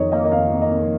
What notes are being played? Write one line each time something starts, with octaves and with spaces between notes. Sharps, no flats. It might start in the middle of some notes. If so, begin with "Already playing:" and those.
Already playing: F2 D#3 C#5 D#5
A#3 D#5
D#5
F2 F5
F2
D#5
F2